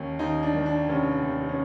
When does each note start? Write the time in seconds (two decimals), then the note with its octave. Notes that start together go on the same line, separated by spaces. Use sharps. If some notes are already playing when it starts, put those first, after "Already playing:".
Already playing: D#2 D#3 C#4
0.19 D#2 D#4
0.43 D4
0.55 D#3
0.66 D4
0.88 F1 C#4
1.23 D#2
1.49 C#4